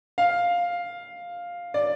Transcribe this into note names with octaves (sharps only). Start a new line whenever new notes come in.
F5
D5